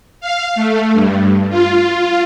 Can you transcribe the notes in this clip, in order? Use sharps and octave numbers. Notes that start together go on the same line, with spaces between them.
F5
A3
G2
F4